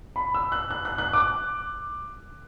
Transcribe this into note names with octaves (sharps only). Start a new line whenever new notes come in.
B5
E6
F#6
F#6
F#6
F#6
D6